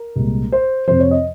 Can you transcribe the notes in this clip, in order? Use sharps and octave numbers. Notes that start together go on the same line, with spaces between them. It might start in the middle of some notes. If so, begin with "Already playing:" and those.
Already playing: A#4
C2 A#2 G#3
C5
F2 C3 F3 C5
C#5
D#5